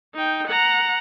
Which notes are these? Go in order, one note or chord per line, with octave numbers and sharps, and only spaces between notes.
D#4 G5
F#5 A#5